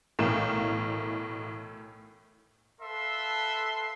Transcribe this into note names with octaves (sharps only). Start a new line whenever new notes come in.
B1 A2 E3 A#4 F5 E7
A4 B4 E5 F5 C6